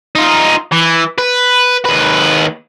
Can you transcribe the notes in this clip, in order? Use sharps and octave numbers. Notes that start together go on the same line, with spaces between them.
D#4 F4
E3
B4
D#2 B4